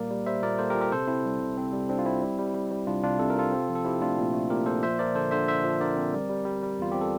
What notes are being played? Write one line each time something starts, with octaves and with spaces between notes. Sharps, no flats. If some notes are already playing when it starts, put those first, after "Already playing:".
Already playing: A#2 G3 A#3 A#4 D5
G3
G3 C5 E5
A#2 A#4 D5
A#3 A4 C5
G4 A#4
A#2
G4 A#4
C3 A4 C5
C4 E4
G3
C2
C4
G3
C4 D4
F4
C4 E4
G3
G3
G3
G3
C2 D4 F4
C3 D4 F4
C3 A4
A#4
C3 F4 A4
C4
F3
A4
C4 E4 G4
A3 D4 F4
A#2
A3
A#2 G4 A#4
A#2 A4 C5
F3 C5 E5
F3 A#4 D5
D3 A4 C5
D3 C5 E5
D3 C5 E5
F3
D3 A#4 D5
C4
G3
G3
G3
G3
E2 F4
C4 G4
A4